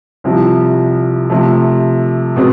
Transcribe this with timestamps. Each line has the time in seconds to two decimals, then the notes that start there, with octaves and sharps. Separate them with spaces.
0.24 C2 C3 F3
1.30 C3 F3 A3
2.36 B2 G#3 C4